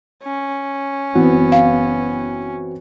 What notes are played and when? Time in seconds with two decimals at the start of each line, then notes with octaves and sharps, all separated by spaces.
0.23 C#4
1.15 F#1 E3 B3 C4 F#4
1.52 F5